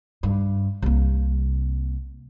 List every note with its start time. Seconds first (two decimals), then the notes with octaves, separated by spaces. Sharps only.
0.23 G2
0.82 C2 A#3